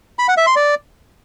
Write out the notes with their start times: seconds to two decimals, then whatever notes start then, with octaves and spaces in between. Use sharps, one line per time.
0.19 B5
0.28 F#5
0.37 E5
0.47 C6
0.56 D5